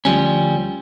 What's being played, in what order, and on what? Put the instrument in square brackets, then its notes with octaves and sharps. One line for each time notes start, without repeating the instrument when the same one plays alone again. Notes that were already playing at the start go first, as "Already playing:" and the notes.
[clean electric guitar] D2 F3 G3 C#4